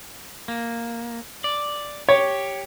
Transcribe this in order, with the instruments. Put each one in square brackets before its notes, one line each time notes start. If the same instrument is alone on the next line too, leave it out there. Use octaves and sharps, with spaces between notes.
[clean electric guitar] A#3
D5
[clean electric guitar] G4 [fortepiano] C#5